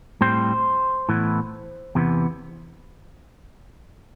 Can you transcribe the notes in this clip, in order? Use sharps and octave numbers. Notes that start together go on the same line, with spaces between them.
A2 G3 C4 C5
A2 E3 B3
E2 C3 E3 B3